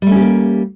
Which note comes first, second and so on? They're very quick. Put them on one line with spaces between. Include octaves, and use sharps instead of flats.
G3 A3 C#4 G4 A#3